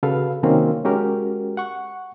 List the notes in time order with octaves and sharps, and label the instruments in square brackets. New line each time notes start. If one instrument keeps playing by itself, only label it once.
[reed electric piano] C#3 F#4 A4 B4 F5
C3 D#3 F#3 A#3 C4 C#4
G#3 C#4 F#4 G4 A#4
F#5 C#6